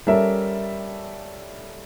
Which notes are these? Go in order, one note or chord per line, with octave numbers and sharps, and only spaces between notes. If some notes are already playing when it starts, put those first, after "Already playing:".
G3 C#4 A4 A#4 E5